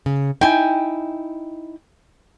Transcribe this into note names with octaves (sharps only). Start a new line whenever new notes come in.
C#3
D#4 E4 G5 G#5